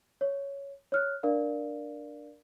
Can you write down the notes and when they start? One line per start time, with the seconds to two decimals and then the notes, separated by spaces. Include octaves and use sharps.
0.21 C#5
0.92 C#5 F6 F#6
1.23 D4 A#4 D5 F5